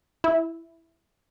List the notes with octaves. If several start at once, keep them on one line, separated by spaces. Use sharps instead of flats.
E4